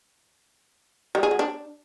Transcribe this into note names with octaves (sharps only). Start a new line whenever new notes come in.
G3
G#4
F#3
D4